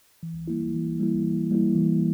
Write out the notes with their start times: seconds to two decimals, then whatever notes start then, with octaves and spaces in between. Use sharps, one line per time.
0.23 E3
0.48 G3 A#3 E4
0.74 E3
1.00 G3 A#3 E4
1.24 E3
1.51 G3 A#3 E4
1.75 E3